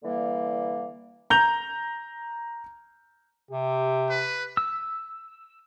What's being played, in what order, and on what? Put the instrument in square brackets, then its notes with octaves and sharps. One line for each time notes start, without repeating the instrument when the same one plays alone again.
[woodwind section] D3 E3 G3 A#3
[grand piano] A#5 G6 F7
[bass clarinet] C3 [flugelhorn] G4
[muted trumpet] B4
[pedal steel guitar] E6